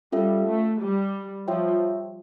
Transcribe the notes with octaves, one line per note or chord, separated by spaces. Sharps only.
G3 C#4 F4 A4 E5
A3
G3
F3 F4 C#5 E5 G5